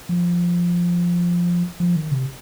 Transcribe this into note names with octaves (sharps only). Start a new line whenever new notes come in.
F3
F3
D#3
C3